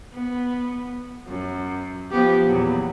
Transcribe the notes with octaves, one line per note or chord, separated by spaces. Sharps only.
B3
F#2
F3 B3 G4
E2 A#2 F#3